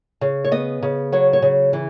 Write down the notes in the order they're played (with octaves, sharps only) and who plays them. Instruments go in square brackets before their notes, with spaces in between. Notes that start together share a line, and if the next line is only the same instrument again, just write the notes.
[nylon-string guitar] C#3
C#5
B3 D#5
C#3
F#3 C#5
C#5
C#3
E3